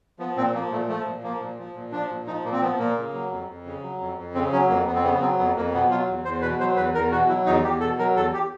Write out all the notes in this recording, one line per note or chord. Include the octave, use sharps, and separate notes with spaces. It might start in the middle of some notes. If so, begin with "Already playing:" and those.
F3 B3
A#2 C4
F3 A#3
A#2 A3
F3 A3
A#2
F3 A#3
A#2
F3
A#2
F3 D4
A#2
F3 D#4
A#2 A#3
C4
F3 B3
A#2 A#3
C#3
F#3
F2
F2
C#3
F#3
F2
F2
C#3 C4
F#3 C#4
F2 A#3
F2 B3
C4
C#3 B3
B3
F#3 C4
F2 B3
F2 A#3
B2 B3
F#3 F4
E2
E2 C5
B2 B4
F#3 C5
E2 B4
E2 A#4
B2 F#4
F#3 E4
E2 D#4
E2 G4
B2 A4
F#3 A#4
E2 A4
G4